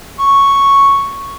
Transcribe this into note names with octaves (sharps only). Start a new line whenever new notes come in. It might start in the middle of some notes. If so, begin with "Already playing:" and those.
C#6